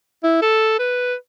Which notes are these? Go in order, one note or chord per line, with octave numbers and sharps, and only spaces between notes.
E4
A4
B4